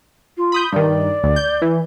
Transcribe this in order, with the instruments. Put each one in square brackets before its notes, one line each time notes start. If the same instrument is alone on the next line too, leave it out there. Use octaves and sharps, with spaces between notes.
[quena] F4
[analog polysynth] B5 D#6 G6
[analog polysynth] G2 D#3 [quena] D5
[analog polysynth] D2
G6
E3